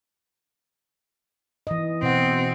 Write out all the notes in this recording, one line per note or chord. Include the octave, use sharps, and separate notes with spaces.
E3 D#5
B2 C4 F#5